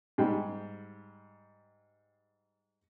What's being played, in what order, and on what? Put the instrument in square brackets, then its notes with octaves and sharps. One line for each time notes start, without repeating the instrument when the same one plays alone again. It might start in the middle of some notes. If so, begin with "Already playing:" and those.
[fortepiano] G#2 G3 G5